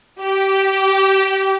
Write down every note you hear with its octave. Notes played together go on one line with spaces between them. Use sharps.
G4